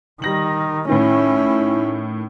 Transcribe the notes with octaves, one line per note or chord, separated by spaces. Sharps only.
D#3 G3 A#6 F#7
A2 D#3 C#4 E4